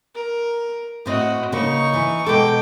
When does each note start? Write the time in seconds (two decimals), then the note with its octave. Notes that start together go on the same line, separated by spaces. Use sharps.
0.15 A#4
1.06 A2 C4 F#4 D#5
1.52 C#3 A#3 D#4 C#6
1.94 E3
2.26 B2 G#3 A4 G5 D6